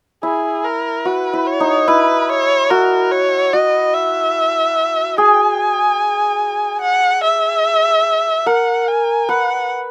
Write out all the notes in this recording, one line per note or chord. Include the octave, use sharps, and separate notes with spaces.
E4 G#4
A#4
F#4 B4
E4
C#5
D#4
E4 B4
C#5
F#4 A#4
C#5
F#4 D#5
E5
G#4 G#5
F#5
E5
A#4 F#5
G#5
B4 F#5